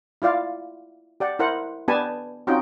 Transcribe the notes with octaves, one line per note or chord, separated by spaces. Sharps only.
E4 F4 D5 F5
G4 D5 F#5
E4 A#4 C5 F#5
B3 D4 G4 B4 G#5 A5
C4 C#4 D#4 F4 F#4 G5